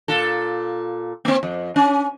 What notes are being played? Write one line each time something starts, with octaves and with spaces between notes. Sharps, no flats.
A#2 F4 A4
A#3 C4
F2
C#4